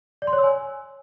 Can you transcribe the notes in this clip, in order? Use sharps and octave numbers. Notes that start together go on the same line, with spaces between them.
D5
C6
C#5
E6
G#5